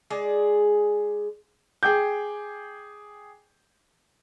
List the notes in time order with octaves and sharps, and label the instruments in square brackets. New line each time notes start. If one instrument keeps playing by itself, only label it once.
[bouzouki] G#3 G#4 D5
[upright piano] G#4 G5 D6 G6